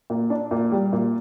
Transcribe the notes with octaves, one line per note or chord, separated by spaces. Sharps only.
A#2
D4
A#2
G3
A#2